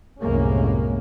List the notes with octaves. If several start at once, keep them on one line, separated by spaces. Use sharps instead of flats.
C2 F#2 A2 G#3 A#3 C#4